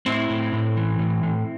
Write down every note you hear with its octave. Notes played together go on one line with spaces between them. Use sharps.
A2 C4 E4
A2
A2
E3
A2
A2